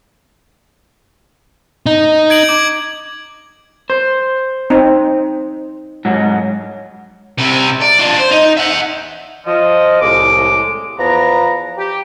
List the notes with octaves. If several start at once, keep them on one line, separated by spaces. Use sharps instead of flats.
D#4
G#6 D7 F#7
D6 G#6
C5
C4 D#4
G#2 F#3
C3 E4
D5
D4 F4
C5
D#4
E5 F#5
F3 D#5
C2 A2 G#3 D6
E2 F3 B3 A#5
G4